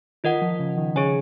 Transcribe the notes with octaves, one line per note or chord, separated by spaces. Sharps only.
D#3 F4 A#4 D#5 F#5
F3
C#3
D#3
C#3 G#4 C#5 G#5